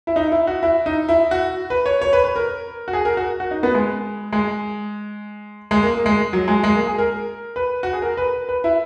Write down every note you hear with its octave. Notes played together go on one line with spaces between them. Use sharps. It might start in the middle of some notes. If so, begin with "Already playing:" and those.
E4
D#4
E4
F#4
E4
D#4
E4
F#4
B4
C#5
C#5
B4
B4
A#4
F#4
G#4
A#4
F#4
F#4
D#4
B3
G#3
G#3
G#3
A#3
A#3
G#3
F#3
G#3
G#3
A#3
G#4
A#4
B4
F#4
G#4
A#4
B4
B4
E4